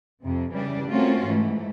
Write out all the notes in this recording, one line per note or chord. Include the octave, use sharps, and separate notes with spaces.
F2 C3
C#3 E3 G3 D4
A3 A#3 C4 C#4 F4 F#4
G#2 E3 A3